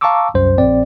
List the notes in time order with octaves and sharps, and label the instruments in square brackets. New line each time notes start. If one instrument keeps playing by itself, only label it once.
[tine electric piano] F5 A5 A#5 C#6 D6 E6
C2 F#2 C5
A#1 C4 D5